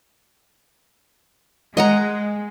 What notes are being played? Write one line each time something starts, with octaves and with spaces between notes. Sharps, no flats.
G#3 D#5 F#5 A#5